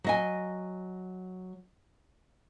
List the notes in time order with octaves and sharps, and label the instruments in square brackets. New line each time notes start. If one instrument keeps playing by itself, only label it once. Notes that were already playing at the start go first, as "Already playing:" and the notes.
[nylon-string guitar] F#3 D#5 G#5